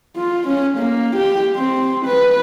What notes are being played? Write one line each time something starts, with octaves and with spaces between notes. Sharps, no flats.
F4
C#4
A#3
G4
C4
B4